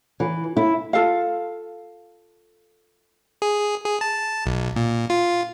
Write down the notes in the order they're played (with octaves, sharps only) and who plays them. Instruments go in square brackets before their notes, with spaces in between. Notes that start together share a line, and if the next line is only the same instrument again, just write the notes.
[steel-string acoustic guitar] E3
E4
[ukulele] F4 A4 F5
[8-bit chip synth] G#4
G#4
A5
B1
A#2
F4